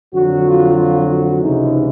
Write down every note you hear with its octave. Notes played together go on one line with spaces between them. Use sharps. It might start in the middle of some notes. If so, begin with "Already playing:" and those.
F2 D3 F#3 F#4
F4
F4
F#4
C#2 C3 E3 G#3 D#4